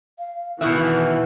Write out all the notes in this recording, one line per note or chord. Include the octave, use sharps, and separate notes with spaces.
F5
B2 D#3 E3 E4 E5 F#5 C#6